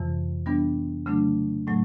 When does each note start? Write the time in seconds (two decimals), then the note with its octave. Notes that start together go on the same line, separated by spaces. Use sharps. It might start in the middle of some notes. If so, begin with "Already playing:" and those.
Already playing: F2 C3 E3
0.46 E3 G3 B3 D4
1.06 C#3 F#3 A3 D4
1.67 A2 F#3 A3